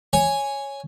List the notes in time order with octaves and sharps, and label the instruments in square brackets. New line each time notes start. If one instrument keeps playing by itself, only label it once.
[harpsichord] C#5 G#5